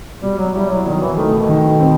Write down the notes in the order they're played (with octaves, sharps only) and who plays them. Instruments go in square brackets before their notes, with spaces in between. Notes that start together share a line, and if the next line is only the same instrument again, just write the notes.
[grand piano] B2 [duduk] G3
[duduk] F#3
[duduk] G3 [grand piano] E4
[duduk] F#3
[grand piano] B2 [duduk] D#3
[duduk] E3
[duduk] D#3 [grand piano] A3
[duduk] B2
[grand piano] D#3
C4